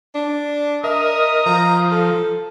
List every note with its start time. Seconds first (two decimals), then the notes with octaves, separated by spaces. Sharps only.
0.15 D4
0.84 A#4 D#5 E5 D#6
1.46 F3 A#5
1.91 A4